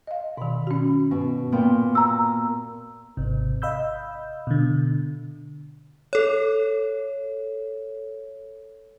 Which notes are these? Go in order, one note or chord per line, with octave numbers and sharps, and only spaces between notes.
D#5 F5
B2 D#3 B5
C#4 F#4
G2 B2
A#2 B3 G5
A#5 E6
G#1 C3
D#5 F5 B5 E6 G6
B2 D3
A4 C#5